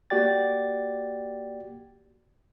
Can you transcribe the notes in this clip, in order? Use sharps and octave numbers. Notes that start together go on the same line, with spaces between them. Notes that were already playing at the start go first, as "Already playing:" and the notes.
A#3 F#4 G4 D5 G5 A6